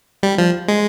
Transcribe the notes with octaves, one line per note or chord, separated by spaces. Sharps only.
G3
F3
G#3